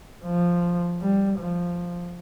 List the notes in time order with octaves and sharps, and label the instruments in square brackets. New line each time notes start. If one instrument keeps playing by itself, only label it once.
[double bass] F3
G3
F3